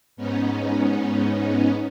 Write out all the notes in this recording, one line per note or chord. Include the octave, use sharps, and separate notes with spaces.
G#2 B3 C#4 D#4